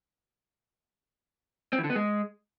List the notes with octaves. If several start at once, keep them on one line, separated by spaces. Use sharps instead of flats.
C4
E3
D3
B3
G#3